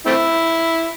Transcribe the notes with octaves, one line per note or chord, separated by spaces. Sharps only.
A3 C4 E4